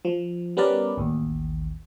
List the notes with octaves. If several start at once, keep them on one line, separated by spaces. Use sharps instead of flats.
F3
G3 B3 C#4 A#4 B4 D5
A1 D#2